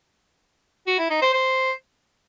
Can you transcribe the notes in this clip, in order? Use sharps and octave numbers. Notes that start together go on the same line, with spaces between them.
F#4
E4
D#4
C5
C5